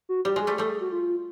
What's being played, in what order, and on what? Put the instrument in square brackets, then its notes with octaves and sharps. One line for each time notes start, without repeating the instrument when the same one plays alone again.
[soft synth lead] F#4
[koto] G3 [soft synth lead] G4
[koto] G#3
[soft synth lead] G#4
[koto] G3 A3
[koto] G3 A3 [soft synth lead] A4
[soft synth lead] G#4
F#4
F4